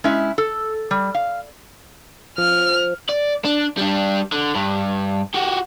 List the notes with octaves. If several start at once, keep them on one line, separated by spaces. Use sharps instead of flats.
G#3 C#4 E4 E5
A4
G3
F5
F3 F6
D5
D4
G3 D4
D3
G2
F#4 G4